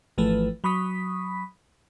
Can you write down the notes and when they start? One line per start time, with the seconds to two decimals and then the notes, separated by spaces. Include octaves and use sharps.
0.18 G#1 E3 F3 A3 B4
0.64 F#3 B5 C#6 D#6 B6